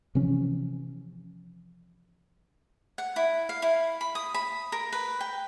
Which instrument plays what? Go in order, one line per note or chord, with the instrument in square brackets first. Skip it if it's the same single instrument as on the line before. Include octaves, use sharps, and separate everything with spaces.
[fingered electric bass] C3 E3 F3 C#4
[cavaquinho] F#5
E4
F5
E4
B5
D#6
B5
A#4
B4
G5